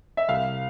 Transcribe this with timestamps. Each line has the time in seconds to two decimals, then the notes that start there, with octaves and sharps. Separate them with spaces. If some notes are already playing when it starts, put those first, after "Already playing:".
0.17 E5
0.29 C2 F5